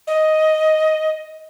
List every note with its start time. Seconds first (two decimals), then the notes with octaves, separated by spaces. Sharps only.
0.07 D#5